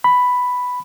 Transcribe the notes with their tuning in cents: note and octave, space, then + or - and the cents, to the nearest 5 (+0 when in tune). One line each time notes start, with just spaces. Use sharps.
B5 +5